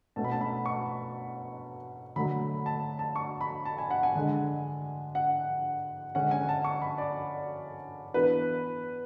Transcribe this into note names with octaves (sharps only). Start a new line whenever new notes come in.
B2 A3 C#4 A5
B5
A5
B5
C#6
D3 F#3 A3 B5
A5
A5
C#6
B5
A5
G#5
F#5
G#5
D3 G#3 D4
F#5
D3 G#3 C#4 F#5
G#5
A5
C#6
B5
D5
E3 B3 D4 B4